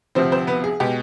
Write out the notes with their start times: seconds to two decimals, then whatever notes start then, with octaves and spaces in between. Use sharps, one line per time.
0.15 D2 C3 F3 C4 C5
0.32 C4 C5
0.47 B3 B4
0.64 G#4
0.80 B2 G#3 G4